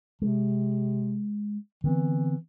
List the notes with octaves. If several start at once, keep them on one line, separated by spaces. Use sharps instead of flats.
C3 G#3
D3 E3 B3 C4